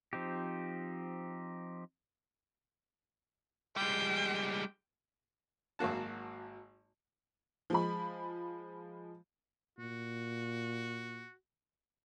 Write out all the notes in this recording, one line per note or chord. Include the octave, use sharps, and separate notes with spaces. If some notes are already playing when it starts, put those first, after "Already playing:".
F3 C4 D#4 G4
G3 G#3 G5
G#1 F#3 A#3 F#4 A5
F3 G#3 B5
A#2 F#4